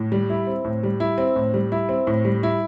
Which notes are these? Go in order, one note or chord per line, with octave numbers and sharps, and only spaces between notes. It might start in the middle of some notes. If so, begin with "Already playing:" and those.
Already playing: A2
G3
E4
C4
A2
G3
E4
C4
A2
G3
E4
C4
A2
G3
E4